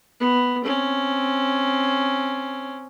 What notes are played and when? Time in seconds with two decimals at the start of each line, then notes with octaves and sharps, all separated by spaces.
0.20 B3
0.64 C4 C#4